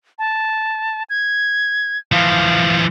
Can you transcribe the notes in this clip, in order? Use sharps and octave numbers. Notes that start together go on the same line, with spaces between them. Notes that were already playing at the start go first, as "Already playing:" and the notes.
A5
G#6
E3 F3 F5